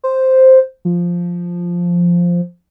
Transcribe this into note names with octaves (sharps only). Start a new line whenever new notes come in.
C5
F3